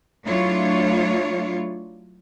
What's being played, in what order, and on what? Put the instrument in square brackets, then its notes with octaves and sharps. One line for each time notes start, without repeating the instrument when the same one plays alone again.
[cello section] F#3 A3 D4 E4 F4 C#5